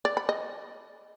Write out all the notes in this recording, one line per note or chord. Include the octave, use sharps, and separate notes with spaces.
D5
B5
D#5